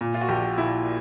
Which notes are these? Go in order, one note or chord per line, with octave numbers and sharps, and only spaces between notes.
A#2
F4
F#4
A#1 G4
A#2 E4